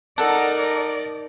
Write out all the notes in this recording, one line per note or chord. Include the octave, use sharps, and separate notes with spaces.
D#4 A4 A#4 D5 F#5 A5